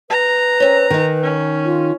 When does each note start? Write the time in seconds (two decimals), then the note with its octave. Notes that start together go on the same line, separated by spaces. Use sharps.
0.10 B4 A#5
0.60 C4 C#4
0.90 D#3 D#4 G#5
1.23 C#4
1.65 F4